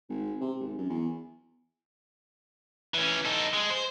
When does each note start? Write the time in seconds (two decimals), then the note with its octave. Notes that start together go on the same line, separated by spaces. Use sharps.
0.09 G#1
0.41 C3
0.60 G#1
0.78 F#2
0.90 E2
2.94 E3 C#4
3.25 D#4 A4
3.53 G#3
3.70 C5